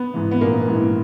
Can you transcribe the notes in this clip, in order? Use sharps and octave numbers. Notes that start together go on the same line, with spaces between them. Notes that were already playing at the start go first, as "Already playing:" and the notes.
Already playing: B3
G#2 E3
B3
A#1 A#3
G#2 E3